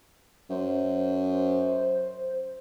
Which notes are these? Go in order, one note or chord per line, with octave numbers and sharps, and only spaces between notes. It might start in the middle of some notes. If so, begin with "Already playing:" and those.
F#2 C5